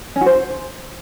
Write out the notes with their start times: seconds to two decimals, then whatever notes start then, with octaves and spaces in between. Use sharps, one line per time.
0.16 C#4
0.21 F#4
0.26 C5